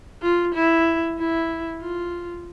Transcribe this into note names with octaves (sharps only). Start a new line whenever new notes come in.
F4
E4
E4
F4